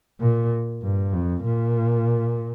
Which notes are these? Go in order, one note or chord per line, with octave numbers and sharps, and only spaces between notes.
A#2
G2
F2
A#2